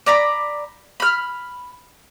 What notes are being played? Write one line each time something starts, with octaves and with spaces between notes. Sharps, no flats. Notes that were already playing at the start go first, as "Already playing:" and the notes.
D5 A#5 B5
B5 F6